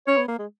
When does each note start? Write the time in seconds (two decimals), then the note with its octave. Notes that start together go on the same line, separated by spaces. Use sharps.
0.07 C#4 C#5
0.17 B3
0.28 A#3
0.39 G#3